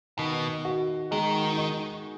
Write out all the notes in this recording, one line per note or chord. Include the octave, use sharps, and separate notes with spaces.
B2 D#3
F#4
D#3 G#3
D#4